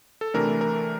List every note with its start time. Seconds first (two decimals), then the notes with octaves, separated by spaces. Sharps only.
0.21 A4
0.34 C3 E3 A3 D4 A#4
0.61 A#4